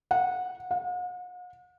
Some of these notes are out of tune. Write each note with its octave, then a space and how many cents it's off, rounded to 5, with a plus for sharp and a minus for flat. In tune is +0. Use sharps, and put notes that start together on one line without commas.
F#5 -20
F#5 -45